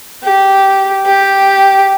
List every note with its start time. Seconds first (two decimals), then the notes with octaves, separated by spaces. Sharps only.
0.23 G4
1.06 G4